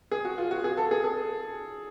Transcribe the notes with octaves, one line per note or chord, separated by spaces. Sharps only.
G#4
F#4
F4
F#4
G#4
A4
G#4
G#4